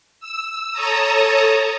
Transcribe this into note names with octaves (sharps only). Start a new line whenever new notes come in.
E6
A4 C#5 A5 A#5 D#6